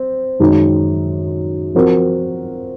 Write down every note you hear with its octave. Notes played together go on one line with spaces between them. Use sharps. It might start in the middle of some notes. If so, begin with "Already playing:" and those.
Already playing: C4
F#2 D#3 G#3 D#4
F3 C4 F#4 A#4